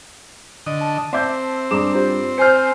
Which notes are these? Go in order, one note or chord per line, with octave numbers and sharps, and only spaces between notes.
D3 D#5
A5
C4 E5 D6 G6
G2 G#4 A#5 D6 E7
F4 G4 C5
C5 G#5 F6 G6 C7